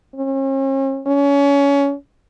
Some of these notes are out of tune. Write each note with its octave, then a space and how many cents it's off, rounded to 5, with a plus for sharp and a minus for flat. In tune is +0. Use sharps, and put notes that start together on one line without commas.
C#4 -40
C#4 +25